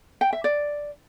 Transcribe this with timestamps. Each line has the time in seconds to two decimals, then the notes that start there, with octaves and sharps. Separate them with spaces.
0.21 G5
0.33 E5
0.44 D5